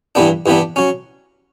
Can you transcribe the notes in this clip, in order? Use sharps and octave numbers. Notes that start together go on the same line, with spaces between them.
G2 E3 G3 B3 D4
G2 E3 G3 B3 D4
F#3 C#4